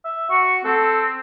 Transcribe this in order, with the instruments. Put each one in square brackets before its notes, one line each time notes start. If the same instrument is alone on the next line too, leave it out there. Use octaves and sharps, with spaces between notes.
[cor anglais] E5
[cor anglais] F#4 [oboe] C#6
[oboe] C4 [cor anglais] A4